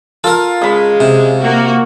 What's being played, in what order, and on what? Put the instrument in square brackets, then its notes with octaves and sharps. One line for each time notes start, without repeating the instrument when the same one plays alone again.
[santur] F4 [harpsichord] A4 A#4
[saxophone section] C#3 G#3 [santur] B5 D#6
[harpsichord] C3
[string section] A#3 F#4